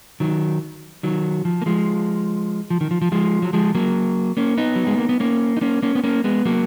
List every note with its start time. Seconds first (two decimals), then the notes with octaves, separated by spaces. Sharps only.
0.20 D#3 F#3
1.03 D#3 F#3
1.45 F3
1.62 A#3
1.66 F3 G#3
2.70 F3
2.81 D#3
2.91 F3
3.02 F3
3.12 F3 G#3
3.42 F#3
3.53 F3 G#3
3.75 F#3 A#3
4.37 A#3 C#4
4.57 B3 D#4
4.76 F#3
4.87 G#3
4.98 A#3
5.09 B3
5.20 A#3 C#4
5.57 D#4
5.61 A#3 C#4
5.82 A#3 C#4
5.95 B3
6.04 A#3 C#4
6.24 G#3 B3
6.45 F#3 A#3